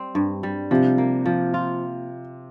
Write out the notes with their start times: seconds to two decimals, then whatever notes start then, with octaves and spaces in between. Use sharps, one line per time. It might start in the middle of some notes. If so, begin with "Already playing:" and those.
Already playing: G3 C4
0.15 G2
0.43 G3
0.71 C3 F3
0.98 A#3
1.26 F3
1.54 F4